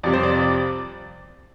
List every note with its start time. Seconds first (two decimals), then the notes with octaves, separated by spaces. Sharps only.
0.03 F2 C3 G3 D5
0.13 C5
0.23 D5